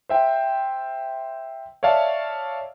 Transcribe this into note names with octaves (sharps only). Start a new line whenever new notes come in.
C5 E5 G5
C#5 D5 E5 F5 A5